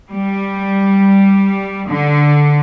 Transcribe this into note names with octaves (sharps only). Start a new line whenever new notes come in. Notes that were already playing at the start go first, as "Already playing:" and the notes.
G3
D3